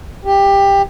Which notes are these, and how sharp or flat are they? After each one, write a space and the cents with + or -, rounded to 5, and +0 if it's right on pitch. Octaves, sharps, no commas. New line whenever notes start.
G4 +15